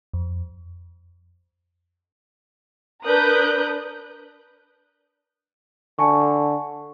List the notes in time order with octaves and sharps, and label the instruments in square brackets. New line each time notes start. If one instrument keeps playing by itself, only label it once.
[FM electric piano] F2
[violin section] D4 A#4 B4 D#6 F#6 G6
[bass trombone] D3 [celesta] G#5 A5 C#6